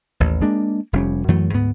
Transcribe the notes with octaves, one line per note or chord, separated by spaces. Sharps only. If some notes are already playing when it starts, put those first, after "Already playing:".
A1 D#2
G#3 A#3 D4
F1 G3 C#4
F#2 E3 F#3 A3
D2 G#2 B3